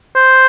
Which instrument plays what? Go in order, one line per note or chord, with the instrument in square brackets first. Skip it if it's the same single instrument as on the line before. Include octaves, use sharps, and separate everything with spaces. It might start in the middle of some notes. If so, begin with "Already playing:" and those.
[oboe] C5